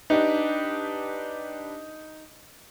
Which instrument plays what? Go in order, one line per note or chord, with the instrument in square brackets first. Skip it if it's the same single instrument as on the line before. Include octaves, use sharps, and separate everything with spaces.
[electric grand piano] D4 G4 B4 [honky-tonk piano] D#4